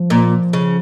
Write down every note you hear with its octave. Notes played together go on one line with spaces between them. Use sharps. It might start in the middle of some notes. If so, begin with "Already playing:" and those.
Already playing: F3
A#2
C#3